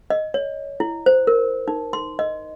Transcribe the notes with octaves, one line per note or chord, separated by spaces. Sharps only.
D#5
C#5
E4
C5
A#4
D#4
C6
D#5